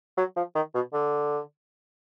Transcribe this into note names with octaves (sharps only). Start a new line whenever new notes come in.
F#3
F3
D#3
B2
D3